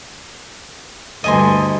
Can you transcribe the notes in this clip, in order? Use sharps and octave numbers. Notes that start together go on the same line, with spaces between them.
D2 G2 D#5 G#5 C6